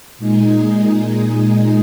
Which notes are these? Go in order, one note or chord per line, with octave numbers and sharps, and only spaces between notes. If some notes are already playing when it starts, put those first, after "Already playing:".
A#2 G#3 D#4 G#4